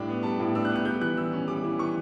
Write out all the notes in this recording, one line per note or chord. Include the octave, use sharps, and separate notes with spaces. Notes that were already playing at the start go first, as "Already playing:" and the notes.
Already playing: A2 G3 D4 G5
B3
G3 A5
A2
D4 E6
F#6
B3
F#6
G3 G6
E3 F#6
E3 E6
C#4
G3 D6
E3
E3 C#6